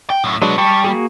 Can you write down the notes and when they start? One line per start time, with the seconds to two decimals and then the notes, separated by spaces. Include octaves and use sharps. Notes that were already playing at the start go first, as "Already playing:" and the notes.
0.10 G5
0.24 A2 F#3
0.42 F#3 G#3 D4 F#4 B4
0.58 G3 A5 C#6
0.84 A#3 F#4 G#4